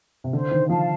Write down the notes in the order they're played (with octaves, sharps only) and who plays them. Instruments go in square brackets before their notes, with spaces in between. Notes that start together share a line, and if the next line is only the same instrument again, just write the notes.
[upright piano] C3
[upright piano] D3 [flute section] C5
[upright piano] D#3
[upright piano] F3 [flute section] F5 A5